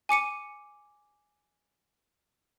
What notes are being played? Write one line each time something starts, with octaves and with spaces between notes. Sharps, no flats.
G#5 D6 C#7 D#7